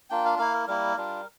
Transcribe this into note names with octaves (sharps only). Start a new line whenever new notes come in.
A#3 D4 F4 G5
F5
A#3 E4 F5
A#4
G3 A#3 E4 A#4
G3 D4 F4